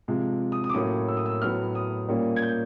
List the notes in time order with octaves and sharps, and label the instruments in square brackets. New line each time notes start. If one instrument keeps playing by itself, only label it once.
[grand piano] C3 F3 G#3
D#6
D#6
D6
A2 F#3 A#3 C#4 D#6
E6
D#6
E6
A2 F#3 B3 F6
D#6
A#2 G3 A#3 C#4
G#6
G6